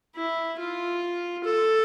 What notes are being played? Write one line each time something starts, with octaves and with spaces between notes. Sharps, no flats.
E4
F4
A4